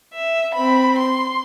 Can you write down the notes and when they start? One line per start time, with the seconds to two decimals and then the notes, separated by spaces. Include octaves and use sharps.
0.14 E5
0.54 C4 B5
0.98 C6